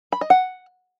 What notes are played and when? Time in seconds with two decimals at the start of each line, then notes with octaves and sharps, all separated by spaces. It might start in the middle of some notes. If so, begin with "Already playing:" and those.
0.12 B5
0.21 D#5
0.30 F#5